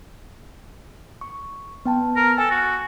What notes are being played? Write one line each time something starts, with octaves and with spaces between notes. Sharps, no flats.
C#6
B3 G5 A5
A#4
A4 G#5
F#4